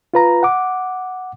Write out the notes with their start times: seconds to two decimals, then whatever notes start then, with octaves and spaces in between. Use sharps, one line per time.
0.14 F4 B4 A#5
0.43 F#5 D6